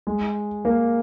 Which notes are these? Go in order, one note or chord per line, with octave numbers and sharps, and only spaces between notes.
G#3
A#3